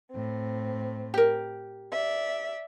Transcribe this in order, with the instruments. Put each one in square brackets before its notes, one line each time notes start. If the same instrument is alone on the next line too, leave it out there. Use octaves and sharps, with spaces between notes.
[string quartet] A2 C4
[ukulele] G4 A#4
[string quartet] D5 E5